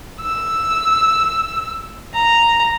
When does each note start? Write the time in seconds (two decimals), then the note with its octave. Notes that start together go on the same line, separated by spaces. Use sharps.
0.21 E6
2.14 A#5